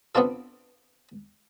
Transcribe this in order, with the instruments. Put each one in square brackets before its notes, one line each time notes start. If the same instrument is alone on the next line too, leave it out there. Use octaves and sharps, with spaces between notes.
[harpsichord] B3 C4 D4 F4 A4